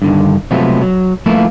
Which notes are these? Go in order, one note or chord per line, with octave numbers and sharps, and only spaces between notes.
G2 D3 D#3
C3 F3 F#3 G#3 A3 B3
F#3
F3 A3 A#3 E4 F4 B4